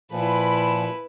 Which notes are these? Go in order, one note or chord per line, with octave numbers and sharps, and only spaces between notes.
A#2 F3 E4 B4